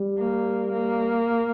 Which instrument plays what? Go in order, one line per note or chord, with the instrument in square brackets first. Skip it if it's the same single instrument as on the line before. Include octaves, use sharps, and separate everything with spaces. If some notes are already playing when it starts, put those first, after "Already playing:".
Already playing: [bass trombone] G3
[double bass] A#3
A#3